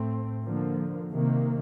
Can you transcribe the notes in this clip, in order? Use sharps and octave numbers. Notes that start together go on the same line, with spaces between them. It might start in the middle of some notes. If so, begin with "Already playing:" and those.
Already playing: A2 A3 C4
D3 F3 A#3
C3 D#3 A#3